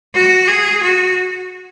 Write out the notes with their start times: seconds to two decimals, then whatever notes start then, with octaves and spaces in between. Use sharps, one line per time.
0.14 F#4
0.48 G#4
0.83 F#4